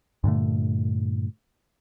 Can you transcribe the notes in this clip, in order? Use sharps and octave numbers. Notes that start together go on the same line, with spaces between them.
G2 A#2 D3 A3